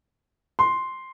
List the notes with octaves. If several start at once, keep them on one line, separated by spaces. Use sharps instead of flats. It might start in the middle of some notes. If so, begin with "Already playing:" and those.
C6